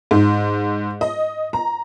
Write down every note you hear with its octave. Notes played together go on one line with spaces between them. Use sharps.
G#2
D#5
A#5